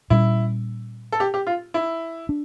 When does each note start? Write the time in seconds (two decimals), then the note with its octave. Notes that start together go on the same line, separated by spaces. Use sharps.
0.10 A#2 G3 C#4 E4
1.12 A4
1.20 G4
1.34 G4
1.47 F4
1.74 E4
2.29 D4